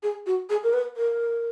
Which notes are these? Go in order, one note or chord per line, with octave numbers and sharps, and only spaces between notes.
G#4
F#4
G#4
A#4
B4
A#4